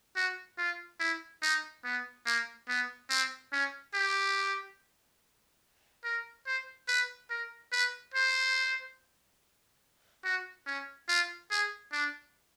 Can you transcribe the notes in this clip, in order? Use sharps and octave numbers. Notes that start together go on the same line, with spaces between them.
F#4
F4
E4
D#4
B3
A#3
B3
C4
C#4
G4
A#4
C5
B4
A#4
B4
C5
F#4
C#4
F4
G#4
D4